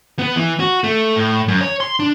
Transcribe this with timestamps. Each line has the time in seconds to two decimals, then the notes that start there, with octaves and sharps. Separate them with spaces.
0.19 B3
0.36 E3
0.60 F#4
0.84 A3
1.16 A2
1.48 F#2
1.61 C#5
1.80 C6
2.00 D4